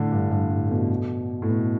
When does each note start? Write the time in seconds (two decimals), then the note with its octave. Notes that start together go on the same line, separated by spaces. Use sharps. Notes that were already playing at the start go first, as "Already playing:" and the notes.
Already playing: A2 D3
0.12 G2
0.31 G2
0.50 A2
0.67 A2
0.71 B2
1.42 A2
1.49 B2